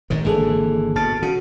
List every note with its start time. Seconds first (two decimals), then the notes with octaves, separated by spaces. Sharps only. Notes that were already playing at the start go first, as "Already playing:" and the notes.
0.10 G#1 G#2 D#3
0.24 G#1 D3 E3 A#3 G#4 A4
0.96 B2 A5 F6 A6
1.22 C#3 F#4